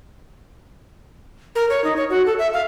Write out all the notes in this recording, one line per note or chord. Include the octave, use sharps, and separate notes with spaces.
A#4
C#5
D#4
C#5
F#4
A4
E5
F5